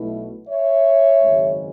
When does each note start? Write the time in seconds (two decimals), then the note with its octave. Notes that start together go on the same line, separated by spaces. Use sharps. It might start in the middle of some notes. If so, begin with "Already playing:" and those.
Already playing: B1 B2 A3 E4
0.48 C#5 E5
1.22 G#1 F#2 C#3 G#3